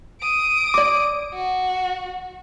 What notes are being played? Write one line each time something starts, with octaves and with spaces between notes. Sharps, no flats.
D#6 D7
D5 D6
F#4